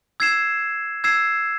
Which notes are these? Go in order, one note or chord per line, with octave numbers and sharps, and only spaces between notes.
E6 G#6 C7 E7
E6 G#6 C7 E7